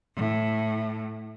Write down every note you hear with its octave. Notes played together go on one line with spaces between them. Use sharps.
A2